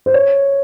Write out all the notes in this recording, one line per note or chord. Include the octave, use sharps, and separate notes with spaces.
C5
C#5